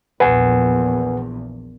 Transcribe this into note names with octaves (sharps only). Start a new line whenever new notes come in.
A#1 E2 A#2 B4 F#5 G#5